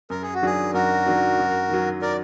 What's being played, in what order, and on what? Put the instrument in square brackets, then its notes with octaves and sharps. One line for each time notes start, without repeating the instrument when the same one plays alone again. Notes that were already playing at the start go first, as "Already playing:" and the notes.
[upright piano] F#2 [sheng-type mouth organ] A#4
[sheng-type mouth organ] G#4
F#4
[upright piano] D#3 F#3 D4 [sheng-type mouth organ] G#4
[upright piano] F#2 [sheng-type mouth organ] F#4 A#4
[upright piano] D#3 F#3 D4
F#2
D#3 F#3
[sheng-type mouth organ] A#4 D5